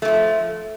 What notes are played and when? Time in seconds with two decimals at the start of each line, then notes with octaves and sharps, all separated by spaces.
0.02 A3
0.05 E3
0.08 F3